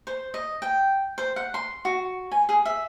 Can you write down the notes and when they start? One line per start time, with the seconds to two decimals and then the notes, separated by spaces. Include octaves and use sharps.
0.07 C5
0.34 D#5
0.62 G5
1.18 C5
1.36 F#5
1.54 C6
1.85 F#4
2.32 G#5
2.49 G#4
2.65 E5